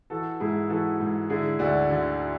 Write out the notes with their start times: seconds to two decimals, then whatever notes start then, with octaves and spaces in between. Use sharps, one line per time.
0.10 E3 F#4 A4
0.40 G#2 E4 G#4
0.70 E3 F#4 A4
1.00 G#2
1.29 D3 E4 G#4
1.59 D2 D4 F#4
1.90 D3